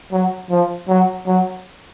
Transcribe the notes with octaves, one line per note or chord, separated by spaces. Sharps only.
F#3
F3
F#3
F#3